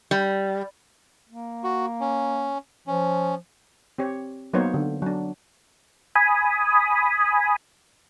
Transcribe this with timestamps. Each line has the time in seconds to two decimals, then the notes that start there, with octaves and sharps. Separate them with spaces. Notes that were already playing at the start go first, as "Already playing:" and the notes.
0.11 G3
1.29 A#3
1.64 F#4
2.00 C#4
2.87 F3 C#4
3.98 C4 G4 C#5
4.53 F#3 A#3 B3 D#4 C5 C#5
4.74 D3
5.02 F#3 D4
6.16 G#5 B5 D#6